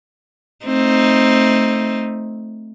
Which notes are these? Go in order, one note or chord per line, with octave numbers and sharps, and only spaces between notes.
A3 C4 D#4